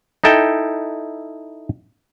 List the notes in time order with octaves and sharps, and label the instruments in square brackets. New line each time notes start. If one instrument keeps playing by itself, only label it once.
[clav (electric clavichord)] D#4 E4 A4 G5